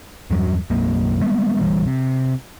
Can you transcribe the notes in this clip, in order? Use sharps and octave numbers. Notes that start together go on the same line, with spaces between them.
E2 G2 F#3
B1 F#2 A#3
G3 G#3 A#3 B3
A#1 E3 G3
C3